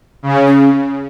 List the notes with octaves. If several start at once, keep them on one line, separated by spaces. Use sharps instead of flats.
C#3
C#4